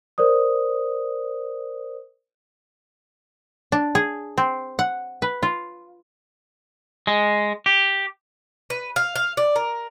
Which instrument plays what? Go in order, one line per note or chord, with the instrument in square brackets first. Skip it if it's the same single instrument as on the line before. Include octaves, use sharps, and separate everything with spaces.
[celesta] A#4 C5 D5 D#6
[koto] D4
G#4
C4
F#5
B4
F4
[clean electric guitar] G#3
G4
[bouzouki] B4
F5
F5
D5
A#4